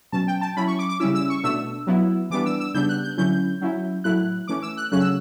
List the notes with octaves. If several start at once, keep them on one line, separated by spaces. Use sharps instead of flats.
B2 F#3 C#4 A5
G5
A5
F#3 C#4 E4 B5
C#6
D6
D6
C#3 G3 C#4 E4 E6
E6
C#6
B2 A3 D4 E6
F#3 B3 E4
E3 G3 B3 D4 D6
E6
E6
C#3 G3 B3 D4 G6
F#6
G6
D3 F#3 C#4 E4 G6
F#3 C#4 E4
A2 F#3 A3 E4 F#6
E3 A3 C#4 D6
E6
F#6
C#3 F#3 A3 C#4 F#6
E6